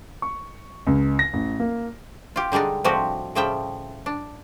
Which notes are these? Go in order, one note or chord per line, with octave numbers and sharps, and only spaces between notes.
C#6
C#2
A#6
A1
A#3
F4 G4
D3 G3 G#3 D4 D#4
A2 F3 G3 C4 F#4 G4
A2 C#3 F3 G3 E5 G5
D4